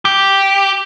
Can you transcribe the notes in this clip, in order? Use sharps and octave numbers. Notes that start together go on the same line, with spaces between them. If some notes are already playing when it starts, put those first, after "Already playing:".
G4